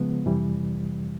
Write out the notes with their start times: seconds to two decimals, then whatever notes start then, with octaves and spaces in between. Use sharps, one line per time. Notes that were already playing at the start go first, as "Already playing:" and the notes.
Already playing: C#3 F3 G#3 B3
0.25 F2 C3 E3 G3